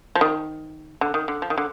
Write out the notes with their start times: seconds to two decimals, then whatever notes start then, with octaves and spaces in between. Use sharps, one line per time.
0.15 F3
0.21 D#3
1.01 D3
1.14 D#3
1.28 D3
1.42 F3
1.50 D#3
1.58 D3